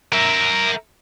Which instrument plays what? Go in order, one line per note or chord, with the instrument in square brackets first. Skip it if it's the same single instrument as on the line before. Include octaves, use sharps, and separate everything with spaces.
[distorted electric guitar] A#4 E5